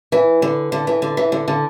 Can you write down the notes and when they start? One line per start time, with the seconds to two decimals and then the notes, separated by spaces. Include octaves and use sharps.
0.12 E3
0.42 D3
0.72 D3
0.87 E3
1.02 D3
1.17 E3
1.32 D3
1.48 D3